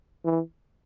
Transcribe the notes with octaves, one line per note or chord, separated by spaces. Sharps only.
E3